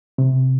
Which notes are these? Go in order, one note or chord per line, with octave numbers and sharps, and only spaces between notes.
C3